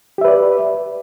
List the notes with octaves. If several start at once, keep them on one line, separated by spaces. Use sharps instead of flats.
G4 B4 D5 E5